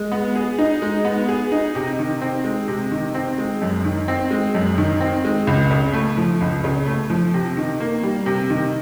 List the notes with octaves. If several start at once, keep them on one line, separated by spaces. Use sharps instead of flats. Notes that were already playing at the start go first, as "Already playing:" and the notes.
Already playing: G#3
B3
G#4
D#4
G#3
B3
G#4
D#4
C3
D#3
C4
G#3
C3
D#3
C4
G#3
F#2
D#3
C4
G#3
F#2
D#3
C4
G#3
C#2
C#3
A3
F3
C#2
C#3
A3
F3
C3
D#3
A#3
G3
C3
D#3